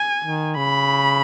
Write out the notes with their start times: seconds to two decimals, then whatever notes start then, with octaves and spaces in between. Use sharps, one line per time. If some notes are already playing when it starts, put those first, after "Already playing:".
Already playing: G#5
0.24 D#3
0.57 C#3 B5